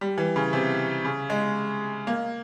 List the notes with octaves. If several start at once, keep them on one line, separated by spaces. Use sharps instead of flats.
G3
E3
C#3
C3
C#3
G#3
A#3